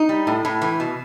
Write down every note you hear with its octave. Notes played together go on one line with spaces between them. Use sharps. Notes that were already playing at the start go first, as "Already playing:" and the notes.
Already playing: D#4
G3
A2
A2
E3
B2